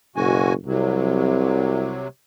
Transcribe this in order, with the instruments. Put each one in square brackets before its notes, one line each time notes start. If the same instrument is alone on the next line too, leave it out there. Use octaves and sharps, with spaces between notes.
[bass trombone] F#1 [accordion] B2 F#4 G#5
[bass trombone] C2 [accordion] C3 F#3